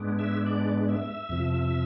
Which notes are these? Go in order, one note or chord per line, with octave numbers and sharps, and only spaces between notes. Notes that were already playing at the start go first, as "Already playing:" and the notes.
Already playing: G#2 G#3 B3 D4
E5
D5
E5
F2 C3 F3